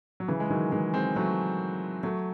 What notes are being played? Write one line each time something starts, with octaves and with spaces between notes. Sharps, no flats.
F#3
C#3 E3
G#3
D#3 F#3
E3 G#3
G#3 C4
F#3 A3
F#3 A3